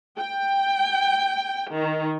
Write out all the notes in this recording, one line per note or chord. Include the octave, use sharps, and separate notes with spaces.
G5
D#3